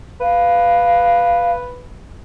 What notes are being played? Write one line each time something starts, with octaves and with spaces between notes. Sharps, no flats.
B4 F5